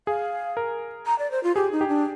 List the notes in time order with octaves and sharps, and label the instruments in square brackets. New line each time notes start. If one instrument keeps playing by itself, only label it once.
[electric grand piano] G#4 [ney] F5
[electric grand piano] A#4
[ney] A#5
D5
C5
F4
[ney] G4 [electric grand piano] G#4
[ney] D#4
[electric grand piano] G4
[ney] D4